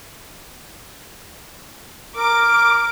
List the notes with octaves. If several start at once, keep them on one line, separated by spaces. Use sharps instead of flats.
A#4 D6